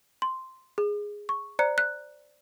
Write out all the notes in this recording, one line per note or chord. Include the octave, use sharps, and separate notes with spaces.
C6
G#4
C#6
C5 D5 A#5 F#6 C#7
F#6